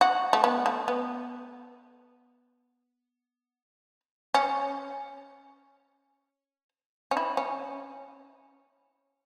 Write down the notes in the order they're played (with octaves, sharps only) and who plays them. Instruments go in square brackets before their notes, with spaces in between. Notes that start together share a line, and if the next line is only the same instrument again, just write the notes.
[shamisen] F#4
A3
B3
A3
B3
C#4
C#4
E4
C#4